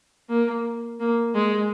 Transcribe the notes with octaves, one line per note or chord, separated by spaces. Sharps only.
A#3
A#3
G#3